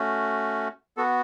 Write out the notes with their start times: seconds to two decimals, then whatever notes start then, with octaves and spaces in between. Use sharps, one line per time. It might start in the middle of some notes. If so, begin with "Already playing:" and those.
Already playing: A3 C#4 F#4
0.97 B3 F#4 A4